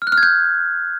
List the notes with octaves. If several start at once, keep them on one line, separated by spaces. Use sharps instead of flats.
F6
F#6
F6
G#6
G6